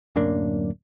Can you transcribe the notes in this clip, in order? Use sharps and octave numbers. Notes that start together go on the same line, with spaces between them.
D1 F#2 A#3 D4